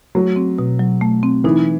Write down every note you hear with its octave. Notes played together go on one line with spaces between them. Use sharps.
F#3 A3
C4
B2
F#3
A3
C4
E3 D#4